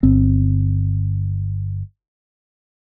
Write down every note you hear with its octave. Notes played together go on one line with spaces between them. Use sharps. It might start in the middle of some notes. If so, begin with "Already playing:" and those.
G1 C4